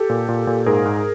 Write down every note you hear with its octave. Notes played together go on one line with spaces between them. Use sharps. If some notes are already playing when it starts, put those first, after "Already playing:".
Already playing: G4 A4
A#2
A#2
A#2
G#2 G#4 A#4
G#2